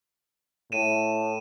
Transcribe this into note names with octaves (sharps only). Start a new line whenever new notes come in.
A2 D#7 E7